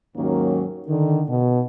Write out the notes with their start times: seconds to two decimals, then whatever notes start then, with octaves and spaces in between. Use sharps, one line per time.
0.17 D#2 G#2 D#3 F#3 A#3 C#4
0.88 D3 D#3
1.29 B2